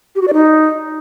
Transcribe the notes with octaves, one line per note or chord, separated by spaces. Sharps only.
G4
F#4
D5
D#4